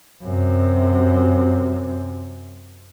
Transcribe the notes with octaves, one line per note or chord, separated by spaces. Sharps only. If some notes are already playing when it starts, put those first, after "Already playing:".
F#2 C3